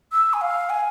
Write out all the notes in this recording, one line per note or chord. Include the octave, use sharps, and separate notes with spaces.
E6
G#5
F5
G#5